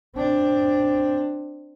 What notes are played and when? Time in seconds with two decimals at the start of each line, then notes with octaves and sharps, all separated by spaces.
0.15 C4 D4